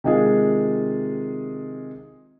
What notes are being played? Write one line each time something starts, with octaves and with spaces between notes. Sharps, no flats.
C3 D#3 G#3 F4 G#4